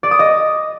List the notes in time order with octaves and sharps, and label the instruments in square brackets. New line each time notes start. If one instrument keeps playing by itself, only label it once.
[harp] D5
D#6
D#5